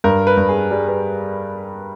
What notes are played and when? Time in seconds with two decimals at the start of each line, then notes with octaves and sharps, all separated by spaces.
0.04 G2 A#4
0.27 B4
0.37 G2
0.49 G#4
0.71 G3 G#4
0.88 B4